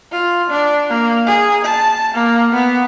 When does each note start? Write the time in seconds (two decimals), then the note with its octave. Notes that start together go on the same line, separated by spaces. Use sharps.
0.12 F4
0.50 D4
0.90 A#3
1.27 G#4
1.65 A5
2.15 A#3
2.53 B3